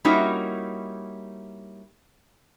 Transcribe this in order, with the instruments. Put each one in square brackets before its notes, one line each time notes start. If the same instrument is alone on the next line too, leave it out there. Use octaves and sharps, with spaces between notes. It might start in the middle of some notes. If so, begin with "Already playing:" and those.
[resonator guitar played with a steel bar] G3 A#3 C#4 D#4 E4 F#4